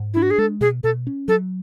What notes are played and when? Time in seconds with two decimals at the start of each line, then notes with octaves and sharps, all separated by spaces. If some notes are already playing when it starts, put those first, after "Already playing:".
Already playing: G#2
0.14 D4 E4
0.22 F#4
0.31 G#4
0.38 G#3 A4
0.61 B2 G#4
0.84 B2 A4
1.07 C#4
1.28 F#3 A4